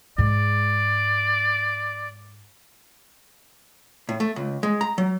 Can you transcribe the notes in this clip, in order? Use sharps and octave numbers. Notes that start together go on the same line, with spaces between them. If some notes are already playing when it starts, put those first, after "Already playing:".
G#2 G#3 D5
A2
A3
C#2
G#3
A#5
F#3